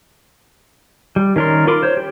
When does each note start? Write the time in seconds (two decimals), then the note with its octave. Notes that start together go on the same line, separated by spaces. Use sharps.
1.16 G3
1.36 D#3 C#4 A#4 D5 C6
1.67 F4 A#4 B5 C6 D6
1.83 C5 C#5
1.97 G4